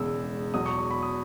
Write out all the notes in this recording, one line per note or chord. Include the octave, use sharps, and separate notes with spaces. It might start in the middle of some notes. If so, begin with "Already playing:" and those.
Already playing: E1 E2 C#3 G#3 E6
E2 B2 F#3 D#6
C#6
C#6
B5
D#6